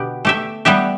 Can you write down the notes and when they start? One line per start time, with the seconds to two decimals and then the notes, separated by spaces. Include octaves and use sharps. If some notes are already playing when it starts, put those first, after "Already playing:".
Already playing: B2 D3 B3 G4
0.25 A3 G4 E5
0.65 G3 B3 G4 E5